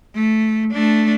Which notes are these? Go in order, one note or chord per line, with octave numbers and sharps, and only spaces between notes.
A3
A3 D4